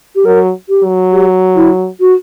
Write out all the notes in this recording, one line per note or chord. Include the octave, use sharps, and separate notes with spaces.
G4
F#3 A#4
G4
F#3
G4
E4
F#4